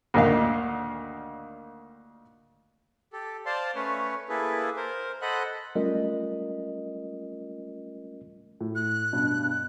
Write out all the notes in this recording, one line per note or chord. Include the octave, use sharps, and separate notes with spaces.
D2 A#2 D#3 A#3 F5
G4 A4
C5 D5 F5 A5 C6
A3 C#4 B4 C#5
A#3 E4 G#4 A4 B4
A#4 C5
A4 C5 D#5 F#5 B5 F#6
G3 A3 C#4 F4 A#4 D#5
A2
F#6
G2 B2